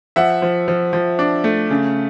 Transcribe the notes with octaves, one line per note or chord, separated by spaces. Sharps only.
F3 E5 F#5
F3
F3
F3
D4
A3
C#3